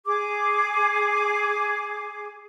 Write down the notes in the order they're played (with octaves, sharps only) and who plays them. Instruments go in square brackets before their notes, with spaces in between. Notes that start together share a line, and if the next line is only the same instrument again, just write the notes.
[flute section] G#4 D6